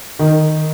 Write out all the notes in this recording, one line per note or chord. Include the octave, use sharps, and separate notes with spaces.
D#3